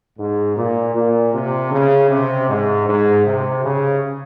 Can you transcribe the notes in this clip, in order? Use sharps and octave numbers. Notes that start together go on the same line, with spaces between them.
G#2
A#2
A#2
C3
C#3
C3
G#2
G#2
C3
C#3